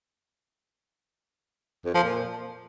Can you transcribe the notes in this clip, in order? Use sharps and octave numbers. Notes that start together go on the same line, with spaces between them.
F2
F3
A#2